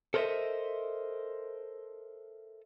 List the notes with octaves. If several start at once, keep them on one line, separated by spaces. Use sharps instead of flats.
A4 A#4 C5 C#5 D#5 E5